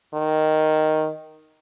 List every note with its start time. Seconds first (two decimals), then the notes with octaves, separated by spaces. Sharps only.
0.14 D#3